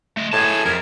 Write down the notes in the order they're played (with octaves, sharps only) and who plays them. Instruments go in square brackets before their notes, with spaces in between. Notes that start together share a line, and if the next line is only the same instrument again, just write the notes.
[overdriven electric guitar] A3 D#5
[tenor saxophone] A2 [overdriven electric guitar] G#4 A5 [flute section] G#6
[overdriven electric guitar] F2 [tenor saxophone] A#4